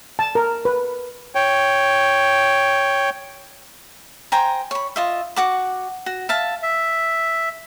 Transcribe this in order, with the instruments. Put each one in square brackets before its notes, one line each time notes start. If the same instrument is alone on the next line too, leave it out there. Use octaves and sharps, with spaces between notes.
[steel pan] A5
A#4
B4
[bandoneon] C#5 G5
[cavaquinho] C5 G5 G#5 A#5
C#5 B5
F4 D#5 E5
F#4 F#5 D6
F#4
E5 F5 A5
[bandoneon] E5